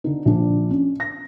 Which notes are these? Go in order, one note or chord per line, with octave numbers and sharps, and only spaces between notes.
D3 D#4
A#1 D4
C#4
A#6